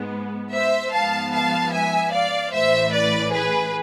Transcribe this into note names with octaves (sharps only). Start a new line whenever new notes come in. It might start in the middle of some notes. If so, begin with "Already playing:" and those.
Already playing: G#2 G#3 B3
C5 E5
G#2 F3 B3 F5 A5
F5 A5
E5 G#5
D5 F5
A1 A2 E3 C5 E5
B4 D5
G#4 B4